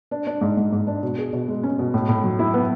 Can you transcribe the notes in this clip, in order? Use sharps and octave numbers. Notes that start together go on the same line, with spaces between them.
D4
D4
G#2
G#2
G#2
D4
B2
G#4
B2
G#3
C#4
B2
A2
A2
F#3
E4
B3